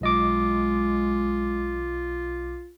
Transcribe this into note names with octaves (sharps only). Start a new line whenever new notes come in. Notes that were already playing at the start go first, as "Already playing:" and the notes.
B1 G#3 F4 D#5 D6